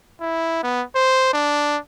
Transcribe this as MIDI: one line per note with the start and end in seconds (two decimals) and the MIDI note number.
0.21 0.62 64
0.63 0.83 59
0.95 1.30 72
1.34 1.78 62